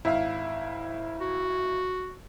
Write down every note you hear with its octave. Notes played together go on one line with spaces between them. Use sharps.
G#1 E4 E5 F5
F#4